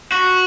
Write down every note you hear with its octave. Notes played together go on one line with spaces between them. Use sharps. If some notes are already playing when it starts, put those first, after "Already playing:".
F#4